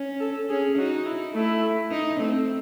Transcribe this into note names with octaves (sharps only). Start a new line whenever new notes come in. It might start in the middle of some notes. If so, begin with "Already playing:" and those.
Already playing: C#4
A4
C#4 G#4
D#4 F#4
E4
A3 E4
D#4
A3 C4